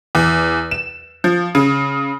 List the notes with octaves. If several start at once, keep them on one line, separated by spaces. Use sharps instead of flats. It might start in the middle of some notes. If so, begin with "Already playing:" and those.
E2
E7
F3
C#3